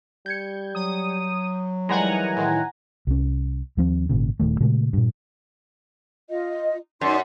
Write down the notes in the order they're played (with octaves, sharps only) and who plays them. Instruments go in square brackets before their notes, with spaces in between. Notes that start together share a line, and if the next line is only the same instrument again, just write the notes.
[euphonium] G3 [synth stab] G6 G#6 C#7
[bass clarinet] F#3 [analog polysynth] D#6
[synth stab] D#3 G3 G#3 [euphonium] E3 [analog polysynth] F#5 G#5 A#5
[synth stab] A2 D#3 G#3
[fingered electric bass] C2 C#4
D#2 F3 C4
G#1 A#2 C#3
D#1 C2 D#3 A3
A#2 C#3 G#3 A3
G2 A#2
[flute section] F4 D#5
[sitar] F#2 [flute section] D#4 D5 C6